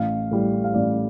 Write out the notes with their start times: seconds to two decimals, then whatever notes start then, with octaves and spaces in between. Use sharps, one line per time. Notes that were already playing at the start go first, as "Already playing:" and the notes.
Already playing: A1 F5
0.31 A2 G3
0.64 F5
0.74 A1 D5